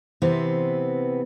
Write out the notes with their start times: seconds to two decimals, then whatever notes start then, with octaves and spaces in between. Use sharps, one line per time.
0.22 C3 E3 B3 C4